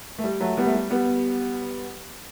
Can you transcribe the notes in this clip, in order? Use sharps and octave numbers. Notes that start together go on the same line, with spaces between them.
A3
G3
F#3 A3
G3 B3
A3
G3
G3 B3